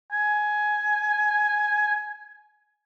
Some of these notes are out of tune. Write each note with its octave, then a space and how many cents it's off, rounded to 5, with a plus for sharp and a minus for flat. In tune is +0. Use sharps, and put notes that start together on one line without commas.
G#5 +15